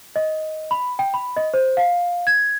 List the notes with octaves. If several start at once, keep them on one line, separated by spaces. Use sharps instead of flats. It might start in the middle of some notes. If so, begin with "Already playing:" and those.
D#5
B5
G5
B5
D#5
C5
F5
G#6